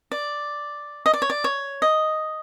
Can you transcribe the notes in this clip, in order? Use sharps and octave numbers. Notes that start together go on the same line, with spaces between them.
D5
D#5
D5
C#5
D5
C#5
D#5